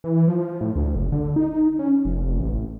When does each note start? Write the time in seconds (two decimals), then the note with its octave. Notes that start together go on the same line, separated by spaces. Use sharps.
0.04 E3
0.28 F3
0.61 A2
0.76 D2
0.96 F#1
1.12 D3
1.36 D#4
1.79 C#4
2.05 F1
2.39 A1